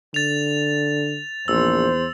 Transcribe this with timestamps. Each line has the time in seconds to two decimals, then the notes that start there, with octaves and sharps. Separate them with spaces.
0.14 D3 A6 F7
1.48 A#1 E2 C5 E6